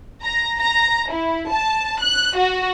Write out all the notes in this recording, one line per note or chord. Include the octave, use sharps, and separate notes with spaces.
A#5
A#5
E4
A5
F#6
F#4